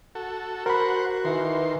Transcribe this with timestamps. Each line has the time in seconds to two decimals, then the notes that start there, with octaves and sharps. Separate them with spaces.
0.15 F#4 A4
0.66 F#4 A#4 C5 F#5 B5
1.25 D#3 E3 C6